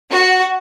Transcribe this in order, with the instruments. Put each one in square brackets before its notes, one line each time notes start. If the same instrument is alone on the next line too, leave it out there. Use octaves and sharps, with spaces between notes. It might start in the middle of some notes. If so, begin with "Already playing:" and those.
[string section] F#4